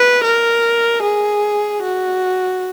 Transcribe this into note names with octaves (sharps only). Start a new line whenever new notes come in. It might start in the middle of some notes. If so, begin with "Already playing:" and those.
Already playing: B4
A#4
G#4
F#4